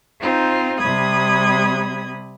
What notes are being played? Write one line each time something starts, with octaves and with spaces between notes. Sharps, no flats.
C4 D#4 F4
C3 G3 B5 D#6 G#6